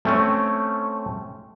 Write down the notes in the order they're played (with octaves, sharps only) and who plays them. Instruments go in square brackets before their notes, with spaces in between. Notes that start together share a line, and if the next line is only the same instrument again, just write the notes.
[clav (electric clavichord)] A3 C4 C#4